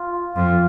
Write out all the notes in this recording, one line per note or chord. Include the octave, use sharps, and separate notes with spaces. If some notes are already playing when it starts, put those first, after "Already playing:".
Already playing: F4
F2 F4